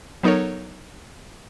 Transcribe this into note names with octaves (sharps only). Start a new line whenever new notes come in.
F#3 B3 D#4 A4 A#4 C#5